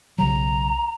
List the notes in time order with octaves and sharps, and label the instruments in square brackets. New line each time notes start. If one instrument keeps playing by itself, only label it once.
[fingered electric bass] B1 C#3 F#3 [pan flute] A#5